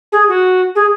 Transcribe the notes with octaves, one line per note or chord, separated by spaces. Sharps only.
G#4
F#4
G#4